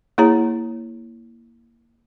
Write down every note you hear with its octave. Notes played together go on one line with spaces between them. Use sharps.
A#3 E4 G#4 C#5 A#5